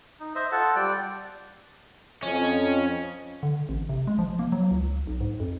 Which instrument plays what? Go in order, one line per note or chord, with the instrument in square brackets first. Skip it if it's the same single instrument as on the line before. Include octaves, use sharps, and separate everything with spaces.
[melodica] D#4
C5 D#5 E5
F4 A4 F#5 A5
G3 D5 G5
[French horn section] F2 D#5 [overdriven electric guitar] C#4
[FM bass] D3
A1
C3
G#3
F3
A#3
F#3
C#2
B1
G#2
F2